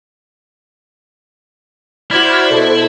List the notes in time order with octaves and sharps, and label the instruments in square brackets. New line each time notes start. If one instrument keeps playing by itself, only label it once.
[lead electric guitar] E4 [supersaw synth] F#4 C5 D5 [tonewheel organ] B5 F6 G#6
[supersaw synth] B2 [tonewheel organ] A4 C5